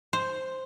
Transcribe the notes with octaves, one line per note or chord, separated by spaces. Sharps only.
C5